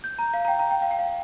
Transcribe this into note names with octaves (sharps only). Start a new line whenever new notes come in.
G6
A#5
F5
A#5
G5
A#5
G5
F5
G5
F5